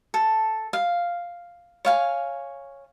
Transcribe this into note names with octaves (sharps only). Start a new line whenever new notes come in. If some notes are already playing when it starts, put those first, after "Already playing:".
A4
F5
C#5 F5 G#5